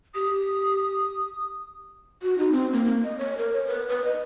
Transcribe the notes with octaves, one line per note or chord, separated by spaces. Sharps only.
G4 D#6
F#4
D#4
C4
A#3
A#3
D#5
C#5
A#4
C#5
B4
B4
D#5